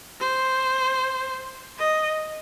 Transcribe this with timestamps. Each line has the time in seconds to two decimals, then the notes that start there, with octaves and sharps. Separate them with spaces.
0.20 C5
1.79 D#5